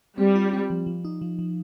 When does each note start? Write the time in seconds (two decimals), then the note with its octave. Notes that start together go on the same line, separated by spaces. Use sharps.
0.18 G3 C4
0.36 F4
0.53 C4
0.70 F3
0.87 F3
1.05 D#4
1.22 F3
1.39 F3